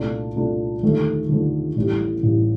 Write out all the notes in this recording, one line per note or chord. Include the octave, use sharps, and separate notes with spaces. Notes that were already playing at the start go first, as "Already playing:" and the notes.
Already playing: C2 A#2 A3 D4 F4
C2 A#2 A3 D4 F4
D#2 D3 F3 A3
D#2 D3 F3 A3
A1 A2 G3
A1 A2 G3